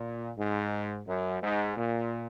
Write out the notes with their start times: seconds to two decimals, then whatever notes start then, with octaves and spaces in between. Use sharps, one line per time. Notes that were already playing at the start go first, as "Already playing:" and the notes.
Already playing: A#2
0.38 G#2
1.07 F#2
1.42 G#2
1.77 A#2